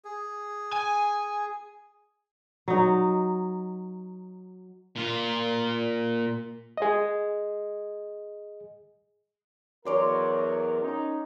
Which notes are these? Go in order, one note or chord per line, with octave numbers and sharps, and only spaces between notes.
G#4
G#5
F#3 D#4
A#2 F4
G#4 D#5
E2 F#3 A#4 C#5 D5 C6
C#4 D#4